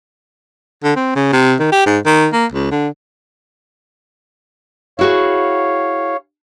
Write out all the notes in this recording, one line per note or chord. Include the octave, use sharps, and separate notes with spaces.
D3
C4
C#3
C3
D#3
G4
G#2
D#3
A#3
C#2
D3
E4 F#4 G#4 C#5 F5